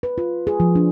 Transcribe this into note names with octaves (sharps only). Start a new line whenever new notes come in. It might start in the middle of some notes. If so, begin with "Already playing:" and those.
B4
F4
G#4
F3
D4